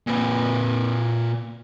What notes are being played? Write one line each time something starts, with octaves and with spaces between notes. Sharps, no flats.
A#2 B4